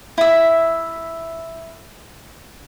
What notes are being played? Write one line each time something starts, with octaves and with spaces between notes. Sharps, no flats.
E4 E5